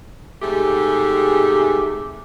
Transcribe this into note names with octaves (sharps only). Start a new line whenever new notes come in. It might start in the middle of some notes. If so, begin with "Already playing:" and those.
G#2 C3 A3 G4 G#4